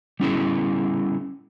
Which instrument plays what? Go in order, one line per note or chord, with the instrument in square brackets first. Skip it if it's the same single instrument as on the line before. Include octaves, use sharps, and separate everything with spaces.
[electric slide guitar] G3 C#4 E4 G#4